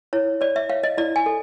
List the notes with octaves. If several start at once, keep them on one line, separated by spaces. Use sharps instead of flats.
E4 C#5
C#5 D5
E5
C#5 F5
D#5
E4 D5
G#5
A4